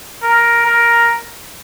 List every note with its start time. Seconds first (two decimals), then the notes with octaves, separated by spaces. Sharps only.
0.23 A#4
0.66 A#4